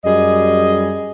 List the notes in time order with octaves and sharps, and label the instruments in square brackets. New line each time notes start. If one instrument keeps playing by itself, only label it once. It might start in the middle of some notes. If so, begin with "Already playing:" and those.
[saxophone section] F#2 G3 G#4 D#5